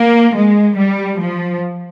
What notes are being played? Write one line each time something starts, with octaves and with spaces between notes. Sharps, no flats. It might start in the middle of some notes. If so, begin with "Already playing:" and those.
Already playing: A#3
G#3
G3
F3